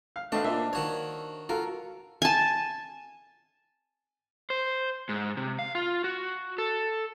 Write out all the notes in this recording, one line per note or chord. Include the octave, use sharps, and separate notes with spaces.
F5
A3 D4 F#4 B4 C5 D#5 F5
A#2 F4 D#5 E5
D#3 F#4 C#5
F4 F#4 A4 A#4
G#5 A5
C5
G#2
C3
F5
F4
F#4
A4